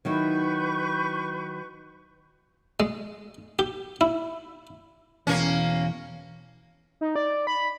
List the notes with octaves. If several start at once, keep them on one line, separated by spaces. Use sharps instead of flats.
D#3 F#3 E4 B4 C#6 G6
G#3
G4
E4
E2 B2 E3 A#3 C#4
D#4
D5
B5